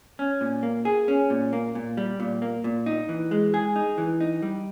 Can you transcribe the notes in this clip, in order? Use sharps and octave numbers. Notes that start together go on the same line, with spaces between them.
C#4
A#2
A#3
G#4
C#4
A#2
A#3
A#2
G3
A#2
A#3
A#2
D#4
E3
G#3
G#4
D#4
E3
D#4
G3